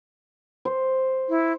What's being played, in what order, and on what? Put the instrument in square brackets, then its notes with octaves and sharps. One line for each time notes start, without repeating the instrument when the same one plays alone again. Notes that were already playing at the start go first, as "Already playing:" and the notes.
[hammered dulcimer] C5
[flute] E4